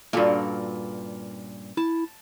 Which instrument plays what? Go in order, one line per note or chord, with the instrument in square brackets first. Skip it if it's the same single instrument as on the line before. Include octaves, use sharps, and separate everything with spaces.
[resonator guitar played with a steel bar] G2 A#2 [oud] C#4 D5 [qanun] F4 F#4 A4
[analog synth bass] E4 [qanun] A5